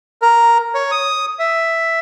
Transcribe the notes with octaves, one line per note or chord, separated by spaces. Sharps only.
A#4
C#5
D#6
E5